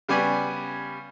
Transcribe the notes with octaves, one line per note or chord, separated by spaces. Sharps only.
C#3 G3 B3 D5 G#5 C#6